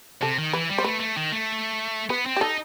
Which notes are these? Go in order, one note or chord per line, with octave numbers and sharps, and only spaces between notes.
C3 A4
D#3
E3 B4
G3
C5
A3 B4
A3
D#3
A3
B3 B4
C4
G4
D#4 A4